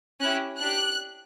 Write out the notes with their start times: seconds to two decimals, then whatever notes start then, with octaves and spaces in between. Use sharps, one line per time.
0.20 C#4 E4 G4 F#6
0.59 D4 G4 F#6